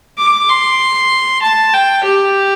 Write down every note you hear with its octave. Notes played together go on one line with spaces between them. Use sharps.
D6
C6
A5
G5
G4